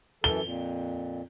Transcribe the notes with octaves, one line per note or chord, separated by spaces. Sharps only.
F#2 E3 A4 G7
F2 A#2